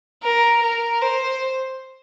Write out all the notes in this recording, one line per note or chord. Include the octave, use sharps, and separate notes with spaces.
A#4
A#4
C5